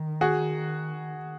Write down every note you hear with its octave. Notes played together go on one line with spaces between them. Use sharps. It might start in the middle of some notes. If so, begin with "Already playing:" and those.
Already playing: D#3
F#4 G#4